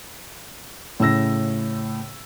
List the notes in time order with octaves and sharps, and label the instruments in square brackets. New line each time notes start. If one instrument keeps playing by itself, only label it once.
[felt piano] A2 C#3 E6 A#6